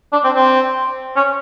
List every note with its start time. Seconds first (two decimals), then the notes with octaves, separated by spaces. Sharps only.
0.12 D4
0.24 C4
0.36 C4
1.16 C#4